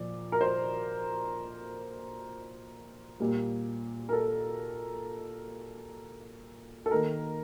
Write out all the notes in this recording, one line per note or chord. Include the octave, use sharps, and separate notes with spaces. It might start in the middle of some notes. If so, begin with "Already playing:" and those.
Already playing: A#2 F3 A#3 D5
A#4
C5
A#2 G3 A#3
A#4
A4
A4
D#3 A#3 D#4 A#4